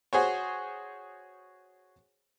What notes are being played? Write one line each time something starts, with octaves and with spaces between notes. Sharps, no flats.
F#4 G#4 C5 C#5